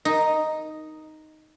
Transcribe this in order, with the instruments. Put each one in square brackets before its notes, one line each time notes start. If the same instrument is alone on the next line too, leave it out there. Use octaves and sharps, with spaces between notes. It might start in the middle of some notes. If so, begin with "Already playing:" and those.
[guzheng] D#4